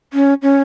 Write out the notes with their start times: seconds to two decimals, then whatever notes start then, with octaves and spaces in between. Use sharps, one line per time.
0.13 C#4
0.42 C#4